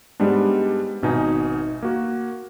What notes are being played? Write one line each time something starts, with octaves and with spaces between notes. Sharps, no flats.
G#2 G3 G#3 B3 D4
G#1 B2 D#4 G#5 D#6
A#3 F#4